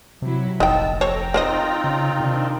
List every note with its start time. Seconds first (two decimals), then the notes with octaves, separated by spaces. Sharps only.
0.22 C3 F#3 E4
0.60 F1 A#1 D#4 G5 A5 E6
1.01 A4 C5 C#5 G5 A#5
1.34 C4 D#4 F4 A#4 C5 D#5
1.84 C#3
2.20 C3 D#3 D4